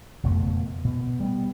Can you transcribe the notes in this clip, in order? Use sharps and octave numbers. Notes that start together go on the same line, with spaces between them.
F#1 F2 B2 A3
B2
G3 A#3 B3